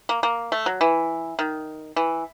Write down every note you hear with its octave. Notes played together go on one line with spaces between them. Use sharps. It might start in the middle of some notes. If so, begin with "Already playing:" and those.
A#3
A#3
A3
F#3
E3
D#3
E3